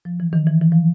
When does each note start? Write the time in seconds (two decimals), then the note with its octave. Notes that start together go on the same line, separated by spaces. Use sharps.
0.05 F3
0.20 E3
0.33 D#3
0.47 E3
0.62 E3
0.72 F3